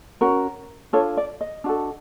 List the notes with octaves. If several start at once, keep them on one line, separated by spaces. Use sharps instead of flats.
C#4 F#4 A#4
D4 F4 A4 C#5
D5
D#5
D4 F#4 A4